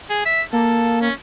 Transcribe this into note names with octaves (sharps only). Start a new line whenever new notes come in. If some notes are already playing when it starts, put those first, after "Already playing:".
G#4
E5
A#3 A4
C#4